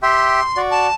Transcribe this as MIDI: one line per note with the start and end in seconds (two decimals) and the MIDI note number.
0.03 0.41 67
0.03 0.41 76
0.03 0.41 79
0.03 0.62 84
0.57 0.87 66
0.57 0.87 74
0.71 0.94 81